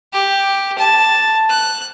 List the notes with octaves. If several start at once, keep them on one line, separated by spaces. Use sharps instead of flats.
G4
A5
F#6